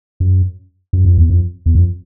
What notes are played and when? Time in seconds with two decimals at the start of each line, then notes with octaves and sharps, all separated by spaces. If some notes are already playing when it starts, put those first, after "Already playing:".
0.20 F#2
0.93 F#2
1.05 F2
1.18 E2
1.30 F2
1.66 E2
1.75 F2